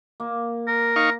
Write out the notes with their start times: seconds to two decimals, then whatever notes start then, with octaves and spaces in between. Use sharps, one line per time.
0.20 A#3
0.67 A#4
0.96 D#4 F5 C#6